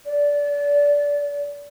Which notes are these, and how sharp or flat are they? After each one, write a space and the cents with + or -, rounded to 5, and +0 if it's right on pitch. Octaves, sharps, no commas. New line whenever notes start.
D5 -25